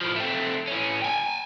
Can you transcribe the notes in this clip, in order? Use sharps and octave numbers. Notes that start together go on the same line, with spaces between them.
A2 F3
A3 C4
A2 C#4
G5 G#5